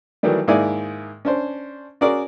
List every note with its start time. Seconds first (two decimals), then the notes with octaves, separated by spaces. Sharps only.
0.23 D#3 E3 F#3 G3 A3
0.48 G#2 D#3 A#3 E4 D5 G#5
1.25 C#4 D4 C5
2.01 C#4 F#4 G#4 A#4 D5